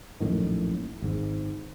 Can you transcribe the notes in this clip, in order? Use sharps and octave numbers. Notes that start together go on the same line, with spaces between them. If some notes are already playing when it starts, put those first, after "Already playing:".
A#1 F#2 A2 D#3
G#1 G#2